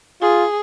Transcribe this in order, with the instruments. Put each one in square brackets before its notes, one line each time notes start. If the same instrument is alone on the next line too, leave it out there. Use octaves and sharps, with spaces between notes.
[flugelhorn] F4 [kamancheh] G#4